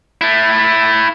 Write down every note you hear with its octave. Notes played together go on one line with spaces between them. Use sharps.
A3 E4